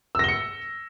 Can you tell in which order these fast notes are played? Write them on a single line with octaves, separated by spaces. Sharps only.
E6 A#6 G7 C#7